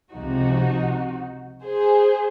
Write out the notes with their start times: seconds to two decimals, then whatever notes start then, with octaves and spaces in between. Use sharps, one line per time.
0.13 C#2 C3 F3 D#4 F#4
1.64 G#4 C5